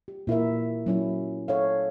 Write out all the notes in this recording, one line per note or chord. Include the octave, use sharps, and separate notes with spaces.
G4
A#2 E4 A#4 E5
F#3 C#4 E4
A4 C#5 E5 F5